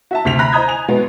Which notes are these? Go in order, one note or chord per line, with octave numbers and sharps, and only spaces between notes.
F#4 E5 A5
D2 C3 B6 F7
A#5 B5 F#6 A#6
C5 D#5 A#5 D#6 G6 G#6
G#5 F7
B2 F#3 G#3 B3